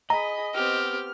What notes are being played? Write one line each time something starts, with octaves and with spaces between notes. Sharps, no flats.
G#4 D#5 A#5 B5
B3 C4 G4 F6